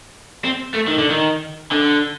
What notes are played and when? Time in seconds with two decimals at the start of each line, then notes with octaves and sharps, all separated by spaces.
0.45 C4
0.74 A3
0.87 D#3
0.98 D3
1.09 D#3
1.72 D3